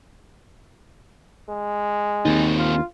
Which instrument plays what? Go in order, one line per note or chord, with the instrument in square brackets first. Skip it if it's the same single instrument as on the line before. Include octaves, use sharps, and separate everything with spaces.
[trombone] G#3
[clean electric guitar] D#2 [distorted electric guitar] C4 D#4
[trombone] F4